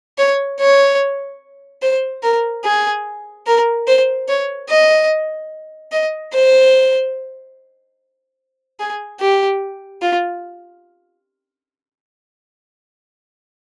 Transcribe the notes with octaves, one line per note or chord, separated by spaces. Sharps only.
C#5
C#5
C5
A#4
G#4
A#4
C5
C#5
D#5
D#5
C5
G#4
G4
F4